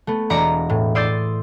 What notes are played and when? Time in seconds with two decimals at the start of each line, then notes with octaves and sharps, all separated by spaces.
0.07 A3 B3
0.30 E1 D5 A#5 A#6 C#7
0.70 A2
0.95 D5 C6 D#6 E6 G6 A6